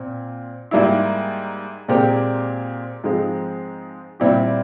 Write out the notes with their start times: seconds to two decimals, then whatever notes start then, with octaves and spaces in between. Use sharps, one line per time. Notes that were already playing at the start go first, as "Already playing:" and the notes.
Already playing: A#2 C4
0.71 G#2 G3 A#3 E4
1.88 A#2 G#3 C4 G4 A#4
3.04 G#2 F3 G#3 C4
4.20 A#2 G3 C4 E4 G4